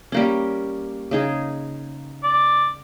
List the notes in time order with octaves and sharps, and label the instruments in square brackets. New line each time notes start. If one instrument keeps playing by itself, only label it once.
[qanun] G3 A#3 C#4
C#3 D#4 G#4
[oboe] D5